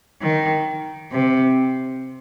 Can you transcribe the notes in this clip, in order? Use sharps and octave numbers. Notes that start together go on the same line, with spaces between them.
D#3
C3